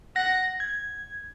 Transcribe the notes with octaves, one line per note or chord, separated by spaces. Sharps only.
F#5 A#6
G#6